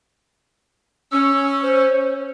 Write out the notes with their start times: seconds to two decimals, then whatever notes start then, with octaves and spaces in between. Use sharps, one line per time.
1.11 C#4 E6
1.62 C5